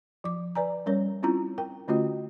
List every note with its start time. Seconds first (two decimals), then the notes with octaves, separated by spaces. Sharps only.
0.24 F3 D6
0.55 B4 D5 G#5 A#5
0.86 G3 C#4 A#4 C#5
1.23 C4 C#4 E4 F4 A#5
1.58 A#4 G5
1.88 D3 A3 C#4 F4 F#4 D#5